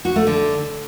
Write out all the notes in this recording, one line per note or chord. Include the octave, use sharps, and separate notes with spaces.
F#4
A3
D3